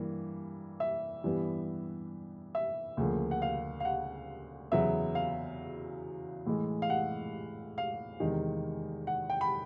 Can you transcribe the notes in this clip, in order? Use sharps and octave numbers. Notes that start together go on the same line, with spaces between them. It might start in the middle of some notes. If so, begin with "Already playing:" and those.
Already playing: G2 E3 A#3
E5
G2 E3 G3 B3
E5
D2 C#3 F3 A#3
F#5
F5
F5
F#5
E2 C#3 F#3 B3 E5
F5
A2 E3 G#3
F5
F#5
F5
E2 C3 D#3 G#3
F#5
G5
B5